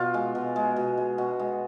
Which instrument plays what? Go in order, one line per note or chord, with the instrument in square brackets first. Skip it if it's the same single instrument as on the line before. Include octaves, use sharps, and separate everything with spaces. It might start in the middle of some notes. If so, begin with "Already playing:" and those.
Already playing: [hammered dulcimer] B2 F4
G#3
B2
G#3
B2
G#3
B2 F#4
G#3